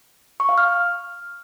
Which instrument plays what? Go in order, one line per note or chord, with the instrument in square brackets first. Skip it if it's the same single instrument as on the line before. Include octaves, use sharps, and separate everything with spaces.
[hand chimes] C#6
F5
F6